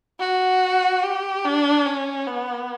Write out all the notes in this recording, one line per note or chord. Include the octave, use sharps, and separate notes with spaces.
F#4
G4
D4
C#4
B3